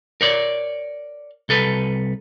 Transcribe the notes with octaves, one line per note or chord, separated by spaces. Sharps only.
A#4 C#5 D5
C2 A4 B4